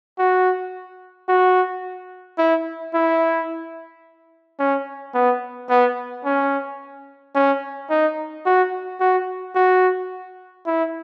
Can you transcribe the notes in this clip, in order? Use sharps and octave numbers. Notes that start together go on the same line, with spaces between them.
F#4
F#4
E4
E4
C#4
B3
B3
C#4
C#4
D#4
F#4
F#4
F#4
E4